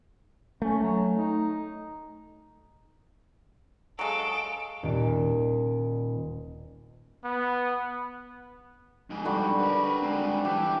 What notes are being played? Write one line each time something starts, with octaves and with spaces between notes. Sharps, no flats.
A3 C#4
F#3
D#4
F#3 G#3 A4 F5 D7
D#1 A#2
B3
F2 G#2
D3 G3 F#4
A#4 B4
G#3 C4
E3 D4 G4